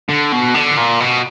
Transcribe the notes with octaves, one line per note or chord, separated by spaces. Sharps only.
D3
B2
D3
A#2
B2